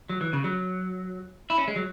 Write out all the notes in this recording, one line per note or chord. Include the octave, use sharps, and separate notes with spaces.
F#3
E3
C#3
F#3
E4
C#4
G#3
F#3